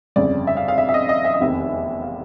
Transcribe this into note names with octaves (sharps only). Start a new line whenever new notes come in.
G1 F2 C#3 D5
E5
F5
F5
E5
E5
D#5
D#5
E5
D#5
F1 E2 C3 D#3 E5
F5